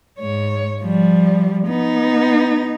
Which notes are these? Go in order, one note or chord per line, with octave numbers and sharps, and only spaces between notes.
G#2 C#5
F3 G3
B3 D#4